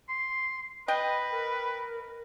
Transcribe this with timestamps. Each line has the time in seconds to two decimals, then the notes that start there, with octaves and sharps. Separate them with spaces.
0.09 C6
0.88 B4 D#5 G5
1.32 A#4